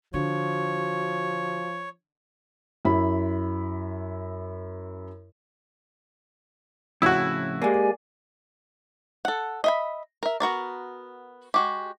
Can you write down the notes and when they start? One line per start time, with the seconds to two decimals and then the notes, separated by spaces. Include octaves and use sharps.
0.14 D3 F3 F#4 C#5
2.85 F#2 E4 B5
7.02 F2 A2 C#3 E4 F#4
7.62 G#3 A#3 G4 D5 G#5
9.25 A4 F#5
9.64 D#5 E5 B5
10.23 A#4 E5
10.40 B3 F#4 A#4 D5
11.54 G#3 F#4 G4